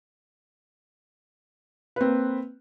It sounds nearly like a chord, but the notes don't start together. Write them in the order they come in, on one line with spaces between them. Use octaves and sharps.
B4 C4 A#3